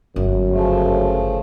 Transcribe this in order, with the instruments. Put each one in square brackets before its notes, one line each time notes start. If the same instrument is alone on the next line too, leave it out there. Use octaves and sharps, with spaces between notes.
[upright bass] G1 [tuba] F#2
[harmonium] C#3 F3 A3